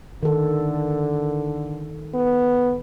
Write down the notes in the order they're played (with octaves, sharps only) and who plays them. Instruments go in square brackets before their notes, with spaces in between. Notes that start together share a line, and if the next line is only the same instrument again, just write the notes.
[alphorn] D3 [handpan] D#3 A4
[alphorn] B3